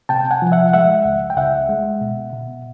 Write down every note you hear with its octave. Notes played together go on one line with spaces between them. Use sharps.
C3 G5 A5
F#5 G#5
F3
E5 F#5
G#3 E5 F#5
C#2
G5
C#2 E5 F#5
G#3
B2
B2